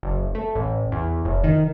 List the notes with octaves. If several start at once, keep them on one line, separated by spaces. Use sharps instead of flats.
F#1
A3
A1
E2
F1
D#3